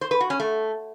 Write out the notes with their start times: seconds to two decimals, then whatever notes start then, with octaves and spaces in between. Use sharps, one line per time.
0.01 C5
0.11 B4
0.20 F#4
0.30 C#4
0.40 A3